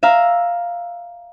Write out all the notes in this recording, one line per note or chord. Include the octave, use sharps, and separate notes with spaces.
E5 F5 A#5